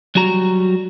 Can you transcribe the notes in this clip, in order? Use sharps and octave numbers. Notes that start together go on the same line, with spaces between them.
F#3 G3 F#4 A#5